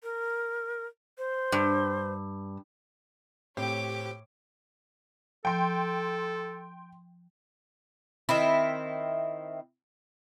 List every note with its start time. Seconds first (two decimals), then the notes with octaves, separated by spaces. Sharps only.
0.03 A#4
1.18 C5
1.52 G2
3.57 A2 C4 G4 C#5 D6
5.45 F3 A4 G5 C6
8.29 D#3 C4 E4